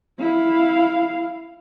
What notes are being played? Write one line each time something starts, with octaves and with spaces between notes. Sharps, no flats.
E4 F5